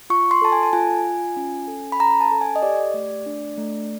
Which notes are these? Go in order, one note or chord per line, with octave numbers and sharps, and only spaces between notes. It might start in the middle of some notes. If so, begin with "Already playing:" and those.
F4 C#6
C6
A4 A5
G#5
A5
F4 G#5
F4
C#4
A4
B5
C#4 A#5
A5
A4
G#5
D#5
G4 D5
A3
D4
A3